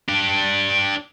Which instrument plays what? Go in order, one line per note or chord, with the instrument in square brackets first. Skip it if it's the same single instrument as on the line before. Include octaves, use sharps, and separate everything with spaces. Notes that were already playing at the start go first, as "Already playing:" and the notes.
[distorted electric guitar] D4 G4